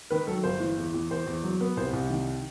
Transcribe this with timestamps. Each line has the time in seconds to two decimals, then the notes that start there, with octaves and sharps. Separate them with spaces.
0.11 D#3 B4
0.27 F#3 A4
0.44 G1 C5
0.60 E3
0.77 E2
0.94 E2
1.11 E2 C5
1.27 E2
1.43 F#3
1.61 B3
1.77 C2 C5
1.93 C2
2.10 D#3